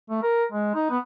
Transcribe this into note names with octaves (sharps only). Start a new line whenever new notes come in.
A3
A#4
G#3
D#4
B3